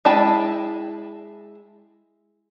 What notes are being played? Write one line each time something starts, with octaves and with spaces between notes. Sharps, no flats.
G#3 E4 G5 A5 B5